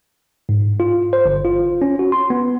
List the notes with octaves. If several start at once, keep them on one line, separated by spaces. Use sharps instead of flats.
G#2
F4
C5
G1
F4
C#4
F#4
C6
B3